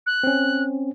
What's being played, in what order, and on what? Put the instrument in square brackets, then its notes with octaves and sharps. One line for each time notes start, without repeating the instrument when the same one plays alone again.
[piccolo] F#6
[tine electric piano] C4 C#4